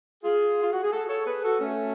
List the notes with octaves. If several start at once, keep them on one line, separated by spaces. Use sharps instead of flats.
F4 G#4
F4
F#4
G#4
F#4 A4
A4 C#5
G#4 B4
F#4 A4
A3 C#4